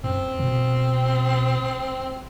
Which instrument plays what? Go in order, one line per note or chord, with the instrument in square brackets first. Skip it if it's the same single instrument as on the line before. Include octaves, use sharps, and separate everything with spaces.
[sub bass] F#2 [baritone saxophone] C4
[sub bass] B2